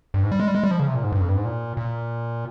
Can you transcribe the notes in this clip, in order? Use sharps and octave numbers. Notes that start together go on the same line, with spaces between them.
G2
G#2
G3
G#3
G3
G#3
G3
F3
C#3
C3
A#2
G#2
G2
F2
G2
G#2
A#2
A#2